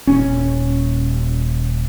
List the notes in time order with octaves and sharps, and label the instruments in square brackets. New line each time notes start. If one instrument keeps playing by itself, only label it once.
[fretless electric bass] D#1 C#4